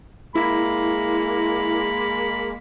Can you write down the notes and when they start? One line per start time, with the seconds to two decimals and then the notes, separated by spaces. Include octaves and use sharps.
0.35 G#3 A#3 E4 B5